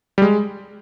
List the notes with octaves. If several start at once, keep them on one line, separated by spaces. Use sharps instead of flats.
G3
G#3